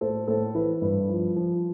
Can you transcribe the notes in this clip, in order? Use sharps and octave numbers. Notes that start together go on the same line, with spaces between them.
A2 A4 C5
A2 A4 C5
E3 B4
G2 B4
F3
F3